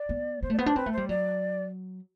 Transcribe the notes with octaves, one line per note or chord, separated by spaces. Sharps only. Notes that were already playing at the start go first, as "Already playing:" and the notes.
Already playing: D5
B3
B3 C5
A3
D5
B3 C5
D4
C4 B4
A3
C5
G3
F#3 D5